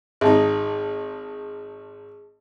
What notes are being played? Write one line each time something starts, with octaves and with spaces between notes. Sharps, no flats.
G#1 D#4 G#4 A5